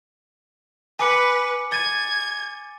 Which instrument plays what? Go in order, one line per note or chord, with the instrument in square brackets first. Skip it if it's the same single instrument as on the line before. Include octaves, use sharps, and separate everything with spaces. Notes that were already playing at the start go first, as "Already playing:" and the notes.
[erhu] B4 [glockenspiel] G#5 D6 C#7
[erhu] G#6 [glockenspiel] A6 D#7